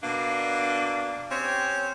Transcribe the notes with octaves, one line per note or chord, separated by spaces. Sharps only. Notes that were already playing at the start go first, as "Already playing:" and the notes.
B2 A#3 D4
C4 C#4 G4 C#5